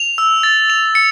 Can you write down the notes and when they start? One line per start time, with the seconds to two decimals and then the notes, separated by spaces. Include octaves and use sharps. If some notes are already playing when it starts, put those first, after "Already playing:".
Already playing: F7
0.18 E6
0.43 A6
0.70 F7
0.95 C#7